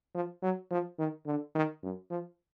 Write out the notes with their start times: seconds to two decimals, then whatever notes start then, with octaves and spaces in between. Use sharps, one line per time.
0.14 F3
0.42 F#3
0.71 F3
0.99 D#3
1.26 D3
1.55 D#3
1.83 F#2
2.10 F3